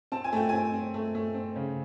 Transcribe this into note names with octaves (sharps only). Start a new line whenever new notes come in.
C4 A5
G#5
A3 G5
C4 G#5
C4
A3
A3
C4
C#3